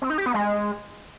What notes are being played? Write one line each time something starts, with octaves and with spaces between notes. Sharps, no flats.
C4
D#4
G4
B3
G#3